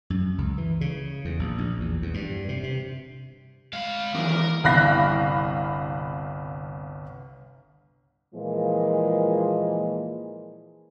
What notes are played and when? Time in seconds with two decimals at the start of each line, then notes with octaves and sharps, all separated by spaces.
0.10 F#2
0.38 C#2
0.58 E3
0.81 C#3
1.25 E2
1.39 A#1
1.58 A#1
1.80 E2
2.02 E2
2.14 G2
2.49 C3
2.63 C3
3.73 G#3 F5 B5
4.15 D#2 E3 A#4
4.64 G1 C2 F5 B5 F#6 A#6
8.35 A#2 E3 F3 G#3 A#3